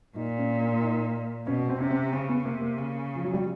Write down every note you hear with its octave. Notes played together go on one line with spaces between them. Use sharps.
A#2 D#4
C#4
D4
D#4
B2 C#4
C4
C3 C#4
C4
C#3 C4
B3
C3 A#3
A#3
C#3
F3
F#3
G3